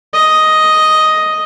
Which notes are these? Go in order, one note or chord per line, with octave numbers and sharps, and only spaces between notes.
D#5